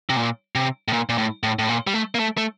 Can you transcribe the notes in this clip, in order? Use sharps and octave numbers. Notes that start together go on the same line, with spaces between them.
C3
A#2
C3
A2
A#2
A#2
A2
A2
A2
A#2
G3
A3
A#3
A3
A3